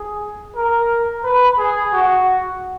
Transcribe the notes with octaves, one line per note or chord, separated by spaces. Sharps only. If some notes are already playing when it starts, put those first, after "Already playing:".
Already playing: G#4
A#4
B4
G#4
F#4